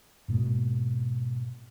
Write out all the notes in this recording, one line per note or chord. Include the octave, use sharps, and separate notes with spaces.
G#2 B2 G#3 A#3